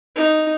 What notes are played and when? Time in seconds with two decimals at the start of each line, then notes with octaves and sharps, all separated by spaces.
0.16 D#4